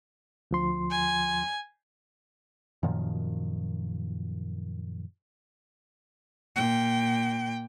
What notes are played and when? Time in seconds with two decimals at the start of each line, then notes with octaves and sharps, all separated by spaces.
0.51 D2 F3 C6
0.91 G#5
2.83 F#2 A#2 D#3 F3
6.56 A#2 G5